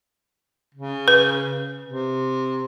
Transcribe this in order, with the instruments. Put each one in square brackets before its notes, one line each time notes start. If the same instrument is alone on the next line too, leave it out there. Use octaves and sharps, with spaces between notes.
[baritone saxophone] C#3
[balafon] B4
[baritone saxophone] C3